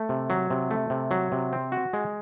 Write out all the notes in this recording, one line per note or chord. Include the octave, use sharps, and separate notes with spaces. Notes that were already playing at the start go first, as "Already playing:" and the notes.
Already playing: A3
C3
F#3
C3
A3
C3
F#3
C3
C4
F#4
G#3